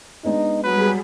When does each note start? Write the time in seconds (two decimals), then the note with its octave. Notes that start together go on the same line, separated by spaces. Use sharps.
0.24 G#3 B3 D4 D#4
0.64 F#3 G3 G#4 B4 B5